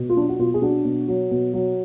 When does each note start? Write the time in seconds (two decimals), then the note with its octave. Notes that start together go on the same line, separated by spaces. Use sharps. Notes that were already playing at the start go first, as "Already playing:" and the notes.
Already playing: B2
0.09 F4
0.16 F#3 D4
0.29 F#4
0.39 B2 F4
0.54 G#4
0.62 F#3 D4 F#4
0.85 B2
1.08 F#3
1.31 B2
1.53 F#3